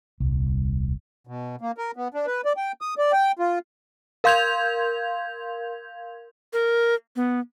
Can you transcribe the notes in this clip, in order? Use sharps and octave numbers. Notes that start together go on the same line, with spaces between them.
D#1 C2
B2
A#3
A#4
B3
D4
B4
D5
G5
D#6
D5
G5
F4
A#4 F5 C6 G6 G#6 F7
A#4
B3